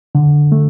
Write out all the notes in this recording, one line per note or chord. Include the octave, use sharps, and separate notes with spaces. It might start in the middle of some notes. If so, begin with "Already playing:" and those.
D3
A3